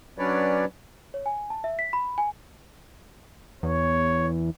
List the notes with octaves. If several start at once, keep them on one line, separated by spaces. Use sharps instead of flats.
F#3 C#4 D4 B4 C#5 D5
C#5
G#5
A5
E5
B6
B5
G#5
E2 C#5